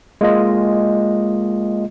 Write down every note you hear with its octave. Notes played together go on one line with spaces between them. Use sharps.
G#3 A#3 F4 D#5